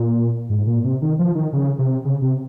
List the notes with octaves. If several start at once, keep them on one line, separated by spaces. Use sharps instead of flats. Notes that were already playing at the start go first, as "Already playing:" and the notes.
Already playing: A#2
G#2
A#2
C3
D#3
F3
D#3
C#3
C3
C#3
C3